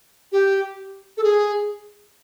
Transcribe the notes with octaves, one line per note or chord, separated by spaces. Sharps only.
G4
A4
G#4